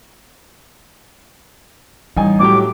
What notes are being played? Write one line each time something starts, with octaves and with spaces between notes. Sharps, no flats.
A1 G3 D#4 G#5
A2 F#3 G4 D6